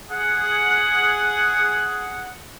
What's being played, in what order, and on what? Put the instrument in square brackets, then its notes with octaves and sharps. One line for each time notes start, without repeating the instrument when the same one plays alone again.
[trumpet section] G#4 F#5